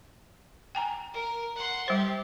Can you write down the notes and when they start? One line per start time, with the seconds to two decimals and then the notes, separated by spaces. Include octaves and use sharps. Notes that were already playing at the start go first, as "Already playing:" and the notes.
0.75 G5 G#5 A#5
1.13 A#4
1.56 F#5 C6
1.88 G3 G4 C5